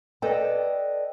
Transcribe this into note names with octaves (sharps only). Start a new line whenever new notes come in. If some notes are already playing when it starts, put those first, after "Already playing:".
A4 B4 D5 D#5 G5 A5